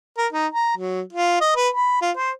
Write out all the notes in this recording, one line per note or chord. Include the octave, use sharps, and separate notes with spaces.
A#4
D#4
A#5
F#3
F4
D#5
B4
B5
F4
C5